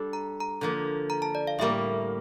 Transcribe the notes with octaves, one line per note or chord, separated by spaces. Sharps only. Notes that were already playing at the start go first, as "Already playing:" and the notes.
Already playing: G3 D4 A4
A#5
A#5
D3 F3 A#3
A#5
A5
D5
F5
A2 G3 A#3 E5